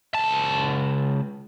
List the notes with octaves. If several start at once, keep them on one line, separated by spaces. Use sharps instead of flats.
C#2 A5